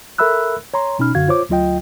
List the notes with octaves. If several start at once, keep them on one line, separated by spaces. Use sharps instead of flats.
A4 A#4 E5 B5 E6 F#6
C#5 A#5 C6
B2 C#4 D#4 B5 F6
F#2 D3 F#4 F5 G#6
F4 C5 C#5 D6
D2 F#3 F4 D#5 G5